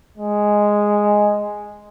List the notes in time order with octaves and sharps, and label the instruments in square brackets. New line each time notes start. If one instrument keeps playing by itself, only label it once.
[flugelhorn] G#3